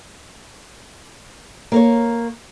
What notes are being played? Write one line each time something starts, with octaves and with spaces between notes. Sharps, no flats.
A#3 A#4 C#5